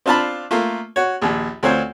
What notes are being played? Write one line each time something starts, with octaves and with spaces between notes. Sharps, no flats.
C4 D4 F4 F5 A5 B5
A3 A#3 F4
F#4 C#5
A#1 D#2
D2 C4 F4 C5 C#5